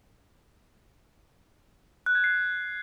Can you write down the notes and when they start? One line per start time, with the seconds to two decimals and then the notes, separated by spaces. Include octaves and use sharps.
2.06 F#6
2.15 G#6
2.24 C7